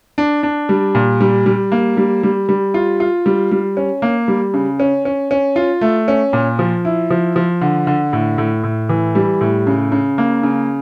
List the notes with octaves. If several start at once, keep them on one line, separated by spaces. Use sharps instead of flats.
D4
D4
G3
A#2
G3
G3
A#3
G3
G3
G3
F4
F4
G3
G3
C#4
A#3
G3
C#3
C#4
C#4
C#4
F4
A3
C#4
A#2
F3
E4
F3
F3
D3
D3
A2
A2
A2
E3
G3
A2
C#3
C#3
A#3
C#3